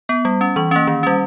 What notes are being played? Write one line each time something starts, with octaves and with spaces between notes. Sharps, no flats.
B3
G3
C#4
E3 C#6
A#3 C#4
D#3
G3 C#4